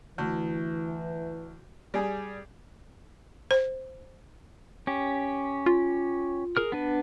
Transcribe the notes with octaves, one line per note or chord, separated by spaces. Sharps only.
D2 E3
G3 G#4
C5
C#4 G4
F4
G#4 A#4 F6
B3 D4 B4